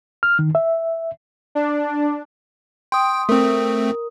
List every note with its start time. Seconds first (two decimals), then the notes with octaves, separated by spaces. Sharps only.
0.23 F6
0.39 D#3
0.55 E5
1.55 D4
2.92 G5 C6 D#6
3.29 A3 C4 A#4 D#6